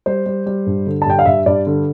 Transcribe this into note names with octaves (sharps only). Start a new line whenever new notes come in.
G3 C5
G3
G3
G2
D3
A5
G2 G5
F5
G2 E5
G2 D5
D3